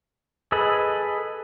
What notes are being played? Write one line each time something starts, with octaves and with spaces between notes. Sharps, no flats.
G#4 A4 B4 D#5 B5